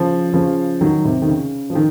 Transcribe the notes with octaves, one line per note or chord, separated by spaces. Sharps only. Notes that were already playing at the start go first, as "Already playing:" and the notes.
Already playing: C#3 F3
C#3 F3
D#3 F#3
C3
D#3
C#3
F3
D#3